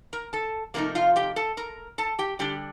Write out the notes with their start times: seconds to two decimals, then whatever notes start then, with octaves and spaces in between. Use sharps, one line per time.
0.13 A#4 A#5
0.33 A4 A5
0.74 C3 F3 A3 A#3 D#4 A#4
0.95 F4 F5
1.16 G4 G5
1.36 A4 A5
1.57 A#4 A#5
1.98 A4 A5
2.19 G4 G5
2.39 D3 G3 D4 G4 G5